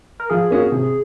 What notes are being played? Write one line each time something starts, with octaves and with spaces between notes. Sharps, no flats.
A#4
F3 G#4
A#3 C#4 F#4
C3